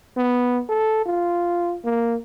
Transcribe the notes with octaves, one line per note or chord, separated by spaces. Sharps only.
B3
A4
F4
A#3